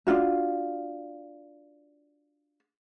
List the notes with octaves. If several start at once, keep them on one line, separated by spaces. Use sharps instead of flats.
D4 D#4 F4 F#4